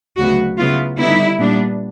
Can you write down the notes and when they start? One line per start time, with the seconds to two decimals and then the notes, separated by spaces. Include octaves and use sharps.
0.18 D2 C#3 F#3 B3 F#4
0.58 C#3 F#3 B3 E4 F4
0.98 D3 G3 B3 D#4 E4
1.38 A#2 G3 B3 D4